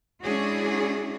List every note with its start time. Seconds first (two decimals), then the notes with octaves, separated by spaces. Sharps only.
0.22 G#3 C#4 D4 E4 F#4 G#4